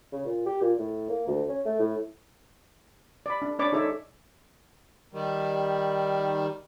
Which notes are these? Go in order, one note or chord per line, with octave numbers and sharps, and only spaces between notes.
C#3
A#2
G4
A#2
A2
A#3
D2
C#4
A3
A2
D5 B5
D4
D4 C#5 D5 B5 D6
D#4 G#4 A4 C#5 D5 E5
D#3 G3